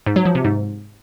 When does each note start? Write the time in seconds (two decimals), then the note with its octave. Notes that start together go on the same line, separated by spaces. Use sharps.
0.06 G#2
0.16 F#3
0.25 F3
0.35 C3
0.44 G#2